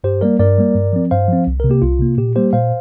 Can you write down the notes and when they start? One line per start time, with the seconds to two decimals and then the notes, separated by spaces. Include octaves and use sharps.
0.04 G2 G4 C5
0.21 G3 A#3 A#4 D5
0.39 G2 A#4 D5
0.58 G3 A#3
0.75 G2
0.93 F3 C4
1.11 G2 C5 F5
1.28 F3 C4
1.47 C2
1.60 C3 A#4
1.69 A#3 G4
1.82 C2 F4
1.99 C3 A#3
2.18 A#2 G4
2.36 G3 A#3 G4 C5
2.53 A#2 C5 F5